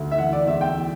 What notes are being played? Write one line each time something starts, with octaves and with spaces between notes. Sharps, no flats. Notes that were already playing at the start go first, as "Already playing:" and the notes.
Already playing: D2
E5
E3 F#5
D5
E2 E5
G5
E3